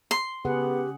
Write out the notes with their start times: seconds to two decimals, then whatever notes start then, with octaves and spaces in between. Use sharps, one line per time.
0.11 C6
0.45 C#3 B3 G4 G#4 F#5